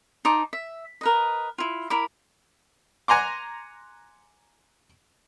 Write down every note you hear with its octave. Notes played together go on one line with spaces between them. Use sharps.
D#4 C5 A5 D6
E5
A#4 B4 D#5
E4 F4
E4 A#4 B5 D6
F#5 G#5 A#5 C6 D6